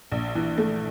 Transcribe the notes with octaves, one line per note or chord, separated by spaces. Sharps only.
A#1
E3
A3